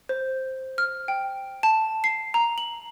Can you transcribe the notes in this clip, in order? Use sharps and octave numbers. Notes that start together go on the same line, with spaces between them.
C5
F6
G5
A5
C7
A#5
F#7